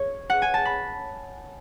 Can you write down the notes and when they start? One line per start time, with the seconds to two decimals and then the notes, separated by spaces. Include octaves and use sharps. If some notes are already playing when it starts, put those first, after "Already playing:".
Already playing: C#5
0.30 F#5
0.42 G#5
0.54 A5
0.65 B5